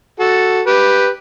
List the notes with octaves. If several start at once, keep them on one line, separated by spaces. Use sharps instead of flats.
F#4 A4
G4 B4